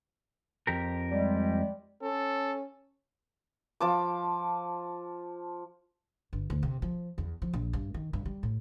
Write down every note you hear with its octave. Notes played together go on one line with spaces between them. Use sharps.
F2 G4 A#4
G3 G#3
C#4 A4
F3 A5 D6
G1
D2
C3
F3
E2
F3
A#1
G2
D#3
G2
G3
A2